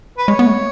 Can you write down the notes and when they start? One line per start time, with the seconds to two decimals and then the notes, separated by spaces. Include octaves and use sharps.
0.18 B4
0.28 G#3 C#5
0.39 B3
0.46 A3